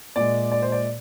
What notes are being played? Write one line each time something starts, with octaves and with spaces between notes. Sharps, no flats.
A#2 G#3 D5
D5
C5
D5